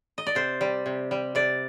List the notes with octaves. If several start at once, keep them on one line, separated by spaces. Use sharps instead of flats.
D#5
D5
C3 C5
G3
C3
G3
C3 D5